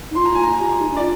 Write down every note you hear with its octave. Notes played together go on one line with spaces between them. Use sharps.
D#4
F4 C6
A#5
F4 G#5
A#5
G4 A#5
G4
D#4
D4
D5
F4